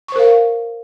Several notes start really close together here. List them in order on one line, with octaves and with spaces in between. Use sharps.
C#6 C5 A#4 F5